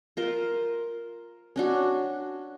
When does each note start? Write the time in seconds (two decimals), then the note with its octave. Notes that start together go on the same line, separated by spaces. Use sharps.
0.17 F4 A#4 C5
1.56 C#4 D4 F#4